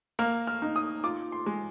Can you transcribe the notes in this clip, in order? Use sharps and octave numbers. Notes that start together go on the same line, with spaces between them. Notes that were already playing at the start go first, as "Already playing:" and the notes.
A#3 F6
F6
D#4
D#6
F4 D6
C6
G#3